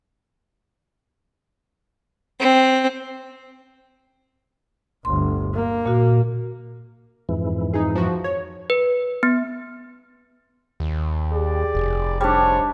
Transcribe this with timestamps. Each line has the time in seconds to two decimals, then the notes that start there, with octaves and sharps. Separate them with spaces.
2.39 C4
5.05 G1 D2 C6
5.54 A#3
5.86 A#2 F#4
7.29 F2 G#2 E3
7.74 D#4 G#4
7.95 F3 F#4
8.24 C#5
8.70 B4
9.23 B3
10.80 D#2
11.32 G4 G#4 D5
11.75 F1
12.21 G3 D4 D#4 C5 C#5